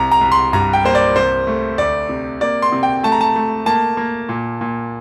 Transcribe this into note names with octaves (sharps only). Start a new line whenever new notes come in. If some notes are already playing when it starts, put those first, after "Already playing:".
Already playing: C2 A#5
A#5
C2
C6
G2 A#5
G5
A#3 C5
D5
C2 C5
A3
D2 D5
C3
A#3 D5
C6
C3
G5
A3 A5
A#5
A5
A3
A#3 A5
A#3
A#2
A#2